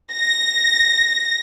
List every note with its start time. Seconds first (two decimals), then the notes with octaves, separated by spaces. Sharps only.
0.13 A#6